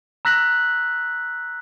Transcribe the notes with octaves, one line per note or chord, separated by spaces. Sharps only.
A#5 E6 F#6 A#6 B6 F#7